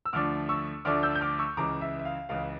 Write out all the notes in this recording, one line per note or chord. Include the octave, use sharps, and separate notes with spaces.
E6
D2 D3 F3 A3 D4 D6 F6
C#6 E6
D2 D3 F3 A3 D4 D6 F6
E6 G6
G6
D6 F6
C#6 E6
C#2 C#3 E3 A#5 D6
E5
E5
F5
C#2 C#3 E3 F5